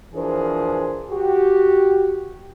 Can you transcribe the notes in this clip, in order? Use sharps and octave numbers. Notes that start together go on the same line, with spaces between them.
E3 F3 D4 G#4 A#4 C5
F#4 G4